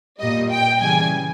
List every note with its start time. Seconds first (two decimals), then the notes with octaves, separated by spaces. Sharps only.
0.19 A#2 G3 D#5
0.51 G5
0.80 C#3 E3 G3 G#5